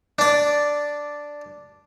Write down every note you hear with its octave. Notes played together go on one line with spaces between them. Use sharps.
D4 D5